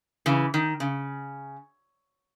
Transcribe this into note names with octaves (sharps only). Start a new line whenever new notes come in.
C#3 E3
D#3
C#3